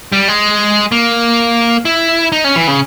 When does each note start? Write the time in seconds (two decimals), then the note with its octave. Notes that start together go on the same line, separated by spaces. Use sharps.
0.12 G3
0.28 G#3
0.92 A#3
1.85 E4
2.32 D#4
2.44 C#4
2.56 E3
2.68 C#3